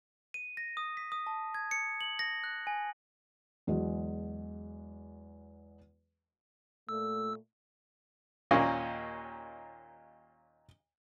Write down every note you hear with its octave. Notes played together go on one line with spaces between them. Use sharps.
D#7
A#6
D#6
B6
D#6
A5
G#6
C#7
F#7
A#6
F#6
G#5
E2 F#3 G#3
A#2 A3 E6
D#2 A#2 A#3 C#4